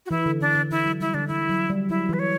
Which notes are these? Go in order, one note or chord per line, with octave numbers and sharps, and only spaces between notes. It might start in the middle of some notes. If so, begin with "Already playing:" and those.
F#4
E3 E4
D3
D3 D4
D3
E3 E4
F#3
G3 E4
D3 D4
E3 E4
F#3
G3
F#3 E4
E3
B4
C#5